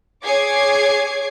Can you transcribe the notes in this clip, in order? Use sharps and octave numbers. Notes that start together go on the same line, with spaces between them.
G#4 C#5 D6 G#6 C7